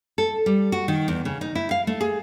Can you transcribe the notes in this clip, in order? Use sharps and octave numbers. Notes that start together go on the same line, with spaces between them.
A4
G3
F#4
D#3
E2
C#3
D#4
E4
F5
A3
G#4